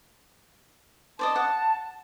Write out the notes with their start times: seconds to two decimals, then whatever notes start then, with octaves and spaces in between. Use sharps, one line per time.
1.19 C5 D5 D#5 A5
1.36 F#5